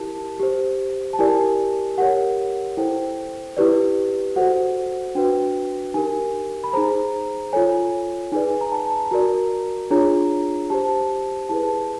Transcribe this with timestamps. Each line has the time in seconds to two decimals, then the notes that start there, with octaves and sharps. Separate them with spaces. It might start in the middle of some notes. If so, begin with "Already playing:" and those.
Already playing: E4 G4 A#4 A5
0.40 G4 C5
1.13 A5
1.19 E4 G4 A#4 D5 G#5
1.98 G4 A#4 C#5 F#5
2.77 E4 A4 C5 G5
3.57 E4 G4 B4 D5
4.36 F#4 A4 C5 F#5
5.15 D4 F#4 B4 G5
5.94 D#4 G4 A#4 G#5
6.64 B5
6.73 D#4 G#4 C5 A#5
7.53 F4 A4 C#5 G#5
8.32 D#4 G#4 B4 D5 G#5
8.61 A#5
8.72 A5
9.11 F#4 A#4 D5 A#5
9.91 D4 F4 G#4 C#5 A#5
10.70 G4 C5 A5
11.49 E4 G#4 B4 A5